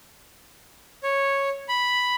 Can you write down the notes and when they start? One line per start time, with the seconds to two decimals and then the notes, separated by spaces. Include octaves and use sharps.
1.03 C#5
1.69 B5